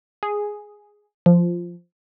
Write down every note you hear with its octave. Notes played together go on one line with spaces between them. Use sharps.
G#4
F3